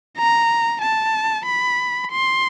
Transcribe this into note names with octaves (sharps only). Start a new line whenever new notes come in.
A#5
A5
B5
C6